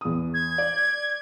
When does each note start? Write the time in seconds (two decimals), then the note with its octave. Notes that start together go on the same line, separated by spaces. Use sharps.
0.01 E2 D#6
0.34 G#6
0.58 D5